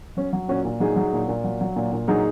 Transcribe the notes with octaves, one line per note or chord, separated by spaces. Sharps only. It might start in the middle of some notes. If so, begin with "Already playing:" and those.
F#3 C#4
F#3
A#2 C#4 F#4
A#2
F#3 D#4 G#4
F#3
A#2
A#2
F#3
F#3
A#2
A#2
F#3 D#4 G#4